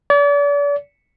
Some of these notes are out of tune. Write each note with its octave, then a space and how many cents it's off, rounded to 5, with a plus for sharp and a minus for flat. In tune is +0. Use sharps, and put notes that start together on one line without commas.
D5 -40